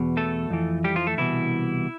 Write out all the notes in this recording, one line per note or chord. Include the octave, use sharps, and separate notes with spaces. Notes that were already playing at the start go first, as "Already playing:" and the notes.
Already playing: E2 B2
A3 A4
F2 E3
G3 G4
F3 F4
A3 A4
C2 B2 E3 E4